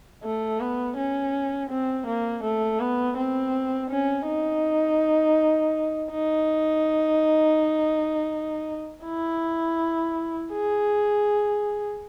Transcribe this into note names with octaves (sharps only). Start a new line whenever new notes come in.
A3
B3
C#4
C4
A#3
A3
B3
C4
C#4
D#4
D#4
E4
G#4